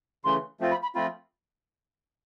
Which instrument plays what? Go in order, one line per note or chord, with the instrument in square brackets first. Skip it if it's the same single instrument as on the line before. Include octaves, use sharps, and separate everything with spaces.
[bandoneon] C#3 E3 A3 [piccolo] C6
[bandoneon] F3 A3 C4 F4
[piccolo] B5
B5
[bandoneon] F3 A3 C4 F4 [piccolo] B5